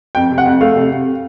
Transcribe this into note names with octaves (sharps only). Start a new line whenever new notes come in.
F2 G5
C3
F#5
F2
A3 F5
C3
C3